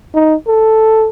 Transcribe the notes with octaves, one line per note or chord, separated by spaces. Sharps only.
D#4
A4